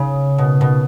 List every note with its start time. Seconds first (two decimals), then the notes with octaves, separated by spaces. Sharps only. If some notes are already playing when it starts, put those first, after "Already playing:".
Already playing: C#3
0.38 B2
0.61 B2